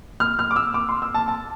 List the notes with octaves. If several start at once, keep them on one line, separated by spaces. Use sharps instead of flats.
F6
F6
D6
E6
D6
C6
E6
A5
A5